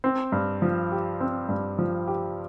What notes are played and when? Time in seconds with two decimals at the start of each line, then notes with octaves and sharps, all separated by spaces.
0.04 C4
0.32 G2
0.62 F3
0.92 G4
1.20 C4
1.49 G2
1.79 F3
2.08 G4